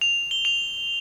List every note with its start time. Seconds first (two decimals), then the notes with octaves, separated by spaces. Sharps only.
0.01 F7
0.31 G7
0.45 F7